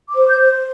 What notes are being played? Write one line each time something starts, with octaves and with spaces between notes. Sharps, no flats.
D6
C5
G6
C5